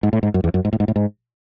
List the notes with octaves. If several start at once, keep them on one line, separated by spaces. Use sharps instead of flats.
G#2
A2
G#2
F#2
E2
F#2
G#2
A2
G#2
A2
G#2